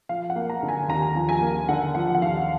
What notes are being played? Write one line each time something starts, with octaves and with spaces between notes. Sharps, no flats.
F3 F5
F#5
A#3
A#5
D3
G#5
D#2 A#5
F3
G#5
A#3
D3 F#5
F3 F#5
F#5
D#2 F5